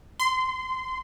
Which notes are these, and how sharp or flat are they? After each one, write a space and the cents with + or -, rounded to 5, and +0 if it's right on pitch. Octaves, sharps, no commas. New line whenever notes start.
C6 -20